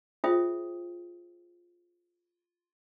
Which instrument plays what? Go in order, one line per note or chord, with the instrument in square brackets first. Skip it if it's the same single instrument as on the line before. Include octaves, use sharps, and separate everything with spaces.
[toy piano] F4 G#4 C5 E5 G5 D#6